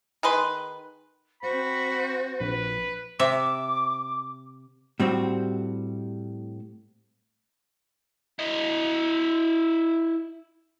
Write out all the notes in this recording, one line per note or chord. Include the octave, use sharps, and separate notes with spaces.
D#3 G#4 B4 C6
C4 F#4 C5 B5
A#1 B4
C3 E5 D6
A2 G3 C4 F#4
E4 D#5